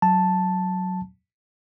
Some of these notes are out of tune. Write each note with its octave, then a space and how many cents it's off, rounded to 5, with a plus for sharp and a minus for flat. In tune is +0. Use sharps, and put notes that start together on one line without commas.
F#3 +0 A5 +0